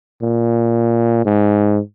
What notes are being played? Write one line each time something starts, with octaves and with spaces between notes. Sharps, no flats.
A#2
G#2